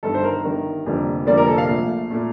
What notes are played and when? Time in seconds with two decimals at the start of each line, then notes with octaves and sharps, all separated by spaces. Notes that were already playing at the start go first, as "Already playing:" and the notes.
0.03 G1 G2 D#3 A4
0.15 C5
0.24 A#4
0.44 G1 G2 D#3
0.85 F1 F2 D3 G3 A#3
1.27 F1 F2 D3 G3 A#3 D5
1.37 A#4
1.48 A4
1.58 F5
1.68 A#1 A#2 A3
2.10 A#2 A3